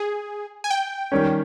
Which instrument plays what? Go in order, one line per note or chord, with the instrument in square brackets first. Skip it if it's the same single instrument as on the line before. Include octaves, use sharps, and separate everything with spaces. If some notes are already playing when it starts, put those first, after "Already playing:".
Already playing: [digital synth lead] G#4
G#5
G5
[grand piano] D#3 G3 C#4